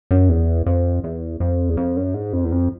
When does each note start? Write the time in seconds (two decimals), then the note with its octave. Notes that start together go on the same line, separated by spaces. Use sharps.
0.11 F#2
0.29 E2
0.66 F2
1.04 E2
1.40 F2
1.69 E2
1.77 F2
1.97 F#2
2.14 G#2
2.33 F2
2.44 E2
2.52 F2